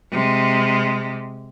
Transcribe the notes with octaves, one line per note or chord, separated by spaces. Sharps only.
C3 G#3